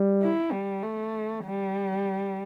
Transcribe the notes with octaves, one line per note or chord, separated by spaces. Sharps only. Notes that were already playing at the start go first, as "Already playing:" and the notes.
Already playing: G3
E4
G3
A3
G3